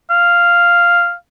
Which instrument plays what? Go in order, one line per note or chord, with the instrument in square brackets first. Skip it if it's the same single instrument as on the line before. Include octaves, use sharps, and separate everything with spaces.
[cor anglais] F5